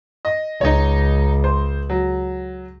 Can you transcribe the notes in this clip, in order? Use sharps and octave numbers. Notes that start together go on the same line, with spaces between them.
D#5
C#2 D#4 C#5
C5
F#3